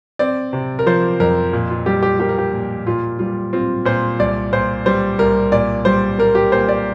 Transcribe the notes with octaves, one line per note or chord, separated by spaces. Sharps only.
C4 D5
C3
A#4
F3 C5
F2 A#4
A#2
F4
G3 G4
G4
A#3 G4
A#4
G4
A#2
A#2 F4
G3 F4
C4 F4
A#2 C5
C2 D5
A#2 C5
G3 C5
C2 A#4
A#2 D5
G3 C5
A#3 A#4
G4
A#2 C5
D5